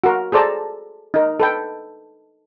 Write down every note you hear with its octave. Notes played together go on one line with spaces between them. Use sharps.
F#4 A#4
G#4 A4 C5 D5 A5 A#5
D#4 A#4
A4 B4 G5